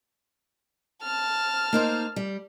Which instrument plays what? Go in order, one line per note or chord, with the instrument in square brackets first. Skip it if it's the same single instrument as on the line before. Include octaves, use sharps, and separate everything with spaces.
[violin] A5 F6
[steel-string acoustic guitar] A#3 D#4 C5
G3